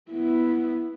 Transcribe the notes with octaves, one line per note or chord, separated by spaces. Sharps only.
B3 E4